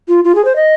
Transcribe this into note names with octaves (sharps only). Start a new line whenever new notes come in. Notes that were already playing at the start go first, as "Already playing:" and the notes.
F4
F4
G#4
C5
D#5